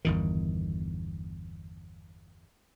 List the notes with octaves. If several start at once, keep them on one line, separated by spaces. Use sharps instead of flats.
G1 E2 D#3